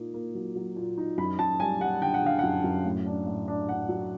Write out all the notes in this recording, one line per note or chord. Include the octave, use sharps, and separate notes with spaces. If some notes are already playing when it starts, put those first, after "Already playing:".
Already playing: A#2 A#3 D#4
A#3
F#3
F#3
A#2
D#4
F#2 B5
F#2 A5
G3 G#5
G3 F#5
D3 G5
F#5
D3 F5
F#2 F#5
F#2
A2
D4
A2
D4
D4 F#5
F#3